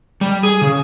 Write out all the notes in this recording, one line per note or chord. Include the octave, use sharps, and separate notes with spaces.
G3
G#4
C#3